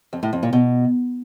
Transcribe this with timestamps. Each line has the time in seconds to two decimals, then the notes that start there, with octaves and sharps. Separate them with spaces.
0.13 F2
0.23 A2
0.33 F2
0.43 A#2
0.53 B2